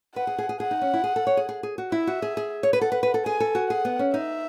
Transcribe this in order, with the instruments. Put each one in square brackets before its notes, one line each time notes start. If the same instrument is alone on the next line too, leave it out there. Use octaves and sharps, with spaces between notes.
[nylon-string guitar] B4 [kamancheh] F#5
[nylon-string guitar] G#4
G#4
G#4
[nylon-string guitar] G#4 [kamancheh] F#5
[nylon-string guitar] D#4
C#4
E4
G#4
A4
C#5
G#4
G#4
G#4
F#4
[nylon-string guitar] E4 [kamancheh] E5
[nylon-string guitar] F#4
G#4
G#4
C#5
B4
[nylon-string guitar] A4 [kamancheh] F#5
[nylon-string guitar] B4
B4
A4
[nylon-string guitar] G#4 [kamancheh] G#5
[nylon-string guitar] A4
F#4
[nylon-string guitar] G#4 [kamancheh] F#5
[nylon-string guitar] B3
C#4
[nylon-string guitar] D#4 [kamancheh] E5